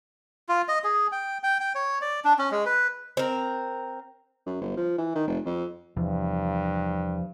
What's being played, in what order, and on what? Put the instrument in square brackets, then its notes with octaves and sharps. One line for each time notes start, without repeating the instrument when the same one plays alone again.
[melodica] F4
D#5
G#4
G5
G5
G5
C#5
D5
D4
C#4
G#3
B4
[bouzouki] C4 A#4
[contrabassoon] F#2
G1
F3
E3
D#3
F1
F2
[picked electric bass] E2 C3 E3 [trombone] G2 [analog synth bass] F3